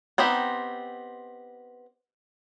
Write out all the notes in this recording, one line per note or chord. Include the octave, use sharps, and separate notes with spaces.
B3 C4 D#4 G4